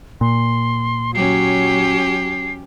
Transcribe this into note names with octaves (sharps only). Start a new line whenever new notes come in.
A#2 C6
F#3 C#4 G4 C7